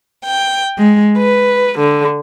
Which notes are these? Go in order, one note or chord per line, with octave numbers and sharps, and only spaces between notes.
G5
G#3
B4
D3